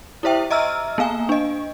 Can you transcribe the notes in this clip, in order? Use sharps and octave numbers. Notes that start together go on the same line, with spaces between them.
E4 G4 C5 E5 G5
D#5 E5 A#5 E6 F6
A#3 B3 F5 G#5
D4 D#5